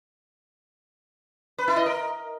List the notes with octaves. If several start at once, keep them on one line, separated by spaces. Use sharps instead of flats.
B4
E4
D#5
A#4